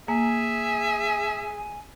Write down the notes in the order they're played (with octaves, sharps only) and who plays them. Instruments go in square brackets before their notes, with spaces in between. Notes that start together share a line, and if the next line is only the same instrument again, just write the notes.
[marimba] A#3 [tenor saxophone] G#4 [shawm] E5 [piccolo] G#5